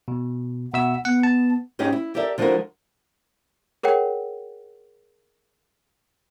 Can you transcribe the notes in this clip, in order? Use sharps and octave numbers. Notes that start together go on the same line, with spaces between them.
B2
B2 E5 F#5 E6
B3 F#5
A5
G#2 C#4 D#4 G4 G#4
E4
G4 A4 A#4 D5 E5
D3 F3 G#3 E4 F#4 A#4
G#4 A#4 C#5 F#5 G5